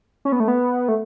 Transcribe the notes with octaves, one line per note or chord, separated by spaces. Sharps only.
C#4
B3
A3
B3
A3